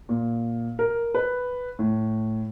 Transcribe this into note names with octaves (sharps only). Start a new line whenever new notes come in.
A#2
A#4
B4
A2